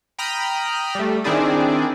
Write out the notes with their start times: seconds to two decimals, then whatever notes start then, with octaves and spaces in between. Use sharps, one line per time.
0.19 G5 A#5 B5 D#6 F6
0.95 G3 A3
1.24 D#3 C4 D4 E4 G#4 D5